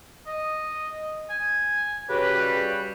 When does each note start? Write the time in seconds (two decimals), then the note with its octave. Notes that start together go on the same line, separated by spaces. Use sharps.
0.27 D#5
1.30 G#5
2.09 C#3 F#4 G4 B4
2.36 G3